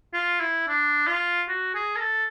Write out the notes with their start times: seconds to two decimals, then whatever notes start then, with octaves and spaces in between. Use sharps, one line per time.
0.13 F4
0.40 E4
0.68 D4
1.07 F4
1.48 F#4
1.75 G#4
1.96 A#4
2.01 A4